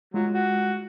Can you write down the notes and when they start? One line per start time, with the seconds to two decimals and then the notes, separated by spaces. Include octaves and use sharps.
0.14 F#3 G#3 F4
0.34 F#4